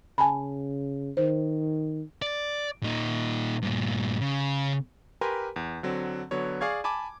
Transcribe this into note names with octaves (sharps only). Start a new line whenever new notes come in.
C#3 G#5 A5 B5
D#3 C5
D5
A#2 D#4
G2 A#2
C#3
G4 A#4 B4 G#5 C6
E2
D3 F#3 C4
D3 F#3 B3 C#5
G#4 D5 F5 C#6 G#6
G#5 A5 B5 D6